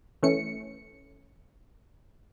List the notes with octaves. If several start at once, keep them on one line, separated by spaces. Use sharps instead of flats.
E3 A3 C#4 C#7